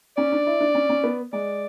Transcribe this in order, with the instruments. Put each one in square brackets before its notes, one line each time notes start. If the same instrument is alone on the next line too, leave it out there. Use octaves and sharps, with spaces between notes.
[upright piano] C#4 [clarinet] D5
[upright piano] D4
E4
D4
C#4
C#4
B3
[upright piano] G#3 [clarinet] D5